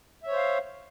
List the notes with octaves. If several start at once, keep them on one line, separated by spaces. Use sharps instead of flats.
C5 C#5 E5 F5